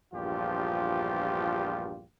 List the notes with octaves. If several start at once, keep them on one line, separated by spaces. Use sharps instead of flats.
A#1 E2 G2 F3 F4 G4